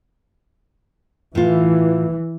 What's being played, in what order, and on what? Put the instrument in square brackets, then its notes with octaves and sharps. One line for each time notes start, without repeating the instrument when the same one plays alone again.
[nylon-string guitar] A2 F4 [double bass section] E3